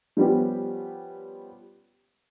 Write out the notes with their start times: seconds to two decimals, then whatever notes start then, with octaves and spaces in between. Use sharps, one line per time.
0.17 F3 G3 B3 C#4 G4